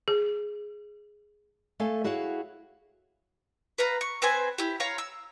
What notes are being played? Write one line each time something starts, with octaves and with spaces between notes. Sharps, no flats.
G#4
A3 A4 F5 G#5
E4 F#4 G#4 C#5 F5 F#5
B4 F5 A#5
C#6
C4 B4 C5 G#5
E4 G4
C#5 F5 A#5 C6
E6